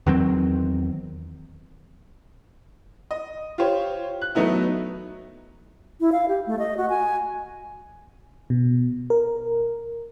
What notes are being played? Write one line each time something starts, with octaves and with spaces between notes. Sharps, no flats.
E2 D#3 F#3 C4
D#5
F4 G4 C5 C#5
F#6
F#3 A3 B3 D#4 E4
E4
F5
G4
A3
D#5
F#4
G#5
B2
A#4